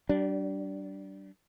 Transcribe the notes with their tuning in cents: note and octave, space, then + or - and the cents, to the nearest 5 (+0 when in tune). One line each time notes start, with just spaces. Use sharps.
G3 -35 D4 -10